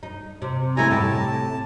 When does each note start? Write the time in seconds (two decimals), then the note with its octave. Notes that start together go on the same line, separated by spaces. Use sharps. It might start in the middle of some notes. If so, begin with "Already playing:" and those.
0.03 D#4
0.42 C3
0.77 G3 A3 D#4 E4 G#5 A#5
0.91 A2 C3 G4 A5